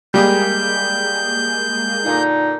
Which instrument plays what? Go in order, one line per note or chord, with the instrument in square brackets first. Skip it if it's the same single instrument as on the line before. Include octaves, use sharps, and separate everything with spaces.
[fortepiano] G3 [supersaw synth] G#3 A#3 G#4 [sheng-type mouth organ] G6
[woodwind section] A#2 D3 D#4